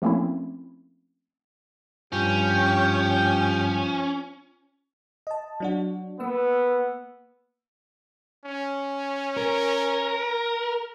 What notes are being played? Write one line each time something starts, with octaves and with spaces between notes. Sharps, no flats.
F3 A3 A#3 C4 C#4 E4
G2 F3 C#4 G4 G5 G6
D#5 A5
F#3 D4 F#4
A#3 B3 E6
C#4
A#4